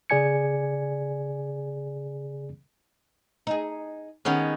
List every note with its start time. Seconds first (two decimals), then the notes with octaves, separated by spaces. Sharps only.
0.10 C#3 G#4 D5 G#5 G#6 C#7
3.47 D#4 G#4
4.25 D#3 G#3 B3 C#4